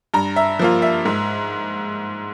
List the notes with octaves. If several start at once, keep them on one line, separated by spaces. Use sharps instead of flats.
G2 A#5
E5
F3 A#3 F4
E5
G#2